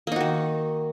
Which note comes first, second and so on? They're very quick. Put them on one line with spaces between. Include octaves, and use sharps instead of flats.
A#3 D#4 F#4 D#3